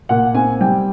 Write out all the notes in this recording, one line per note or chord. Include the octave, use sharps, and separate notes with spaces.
A#2 F#5
C4 G#5
G3 G5